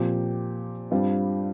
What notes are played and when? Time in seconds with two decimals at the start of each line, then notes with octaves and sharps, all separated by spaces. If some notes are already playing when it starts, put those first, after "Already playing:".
Already playing: A#2 F3 C4 G4
0.91 G2 G3 C4 F4